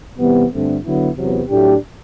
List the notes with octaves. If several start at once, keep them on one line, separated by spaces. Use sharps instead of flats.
E2 C3 G3 B3
G2 D3 A3 C4
D3 F#3 B3 E4
E2 C3 F#3 B3
A2 F#3 A3 D4 G4